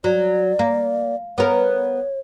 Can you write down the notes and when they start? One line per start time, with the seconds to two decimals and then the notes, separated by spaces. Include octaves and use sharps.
0.04 F#3 D5
0.59 A#3
1.38 B3 A#4 C#5